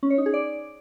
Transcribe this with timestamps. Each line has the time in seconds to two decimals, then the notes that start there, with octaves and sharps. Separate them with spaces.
0.03 C#4
0.10 C#5
0.18 D#4
0.26 G#4
0.34 D5